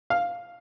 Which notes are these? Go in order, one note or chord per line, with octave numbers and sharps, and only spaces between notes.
F5